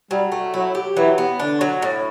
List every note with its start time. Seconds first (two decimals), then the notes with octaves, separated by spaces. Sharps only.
0.11 F#3 G3
0.32 A3
0.54 F#3 E4
0.75 G4
0.97 E3 F#3
1.18 B3
1.39 D3 D4
1.61 F#3
1.82 A2